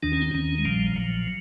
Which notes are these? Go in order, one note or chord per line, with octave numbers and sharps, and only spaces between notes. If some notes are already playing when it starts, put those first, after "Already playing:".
D#2 D#3 D4
C#4
C4
D#2 D#3 C#4
G#3
A#1 A#2 F3 G3
A#1 A#2 F3 F#3